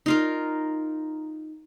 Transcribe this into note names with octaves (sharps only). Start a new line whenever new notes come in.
D#4 F4 A#4